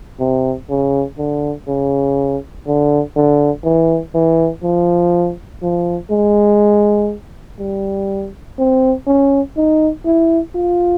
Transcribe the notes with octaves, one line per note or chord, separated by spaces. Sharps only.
C3
C#3
D3
C#3
D3
D3
E3
E3
F3
F3
G#3
G3
C4
C#4
D#4
E4
F4